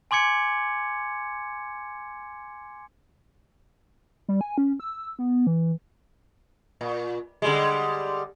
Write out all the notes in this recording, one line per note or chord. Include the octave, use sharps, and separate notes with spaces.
G#5 C6 D6 G#6 C#7
G3
G#5
C#4
E6
B3
E3
A#2
D3 G3 G#3